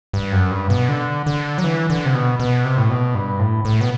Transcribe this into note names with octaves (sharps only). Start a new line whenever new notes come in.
G2
F#2
G2
B2
D3
D3
F#3
E3
D3
C3
B2
B2
C3
A2
B2
G2
A2
A2
B2